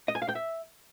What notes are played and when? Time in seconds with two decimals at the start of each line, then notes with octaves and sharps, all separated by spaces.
0.08 D#5
0.15 G#5
0.22 F5
0.29 G5
0.35 E5